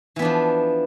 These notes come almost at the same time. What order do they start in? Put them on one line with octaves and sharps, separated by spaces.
E3 B3 D4 F3